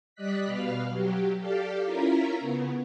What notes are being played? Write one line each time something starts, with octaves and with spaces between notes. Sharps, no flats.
G3 D5 D#5 F#6 B6
B2 B4 F5 F6
F#3 G4
G4 A4 D5 F5
C#4 E4 F4 A#4 A#5 B6
C#3 B3